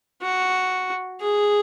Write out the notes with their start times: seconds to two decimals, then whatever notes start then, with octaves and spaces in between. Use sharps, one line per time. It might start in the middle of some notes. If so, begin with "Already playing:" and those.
0.22 F#4
1.21 G#4